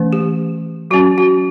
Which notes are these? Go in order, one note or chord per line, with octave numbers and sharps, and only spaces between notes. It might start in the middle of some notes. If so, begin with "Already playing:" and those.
Already playing: E3 A3 C#4
G4
F#3 C#4 F#4
F#4